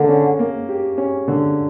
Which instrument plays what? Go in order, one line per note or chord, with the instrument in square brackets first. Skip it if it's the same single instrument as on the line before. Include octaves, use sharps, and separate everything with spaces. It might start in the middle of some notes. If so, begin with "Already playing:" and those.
Already playing: [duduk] D3 [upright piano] A#3
[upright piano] C#4
A#3
G4
C#4
D3